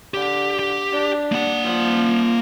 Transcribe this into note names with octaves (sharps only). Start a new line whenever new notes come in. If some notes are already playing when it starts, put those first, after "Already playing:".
D3 G4
G4
D4
A#3 F#5
F3